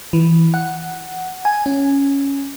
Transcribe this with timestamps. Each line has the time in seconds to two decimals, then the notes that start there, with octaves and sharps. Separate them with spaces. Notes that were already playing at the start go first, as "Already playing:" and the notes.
0.13 E3
0.54 F#5
1.45 G#5
1.66 C#4